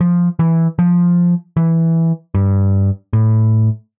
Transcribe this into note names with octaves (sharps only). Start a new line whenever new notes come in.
F3
E3
F3
E3
G2
A2